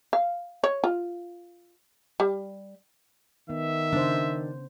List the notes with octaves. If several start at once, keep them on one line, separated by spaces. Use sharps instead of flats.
F5
C#5
F4
G3
D#3 B3 E5
C#3 D4 C5